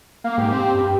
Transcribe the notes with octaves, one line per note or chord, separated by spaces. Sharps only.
A#3 F5
G#2 G4
C4
G2